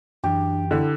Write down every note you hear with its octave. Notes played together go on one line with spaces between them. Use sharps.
F#2 E3 D4 G4
D3 E4